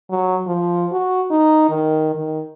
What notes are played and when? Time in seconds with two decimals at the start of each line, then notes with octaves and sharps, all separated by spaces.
0.10 F#3
0.47 F3
0.92 F#4
1.31 D#4
1.70 D#3
2.15 D#3